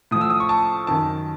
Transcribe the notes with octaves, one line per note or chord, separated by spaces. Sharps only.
A2 F3 D#6
E6
D#6
C#6
A5
F#2 D#3 A5